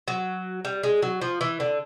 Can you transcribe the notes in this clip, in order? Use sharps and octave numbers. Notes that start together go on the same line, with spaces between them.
F#3
G3
G#3
F#3
F3
E3
D3